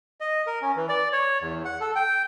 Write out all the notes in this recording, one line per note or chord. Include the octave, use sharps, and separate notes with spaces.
D#5
A#4
C#4
E3
D5
C#5
E2
F#5
A4
G5